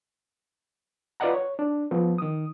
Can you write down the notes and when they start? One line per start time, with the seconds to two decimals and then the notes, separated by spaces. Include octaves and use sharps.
1.20 F4 B4 D5 D#5 F#5 A#5
1.33 C#5
1.59 D4
1.91 F3 B3
2.18 D#3 D#6